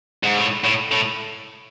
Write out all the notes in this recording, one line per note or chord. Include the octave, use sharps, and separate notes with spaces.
G#2
A2
A2
A2